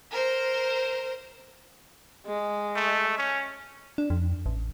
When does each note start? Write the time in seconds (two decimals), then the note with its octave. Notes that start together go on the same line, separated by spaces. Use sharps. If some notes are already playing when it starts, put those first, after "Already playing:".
0.11 A#4 C5
2.27 G#3
2.76 A3
3.18 C#4
3.98 D4
4.10 F2
4.46 A1